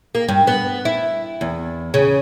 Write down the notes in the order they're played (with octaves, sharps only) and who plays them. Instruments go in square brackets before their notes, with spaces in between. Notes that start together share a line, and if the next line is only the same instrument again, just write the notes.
[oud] A#3
G2
B3
E4
E2
C#3